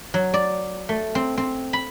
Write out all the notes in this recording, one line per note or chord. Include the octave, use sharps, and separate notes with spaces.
F#3
D5
A3
C4
C4
B5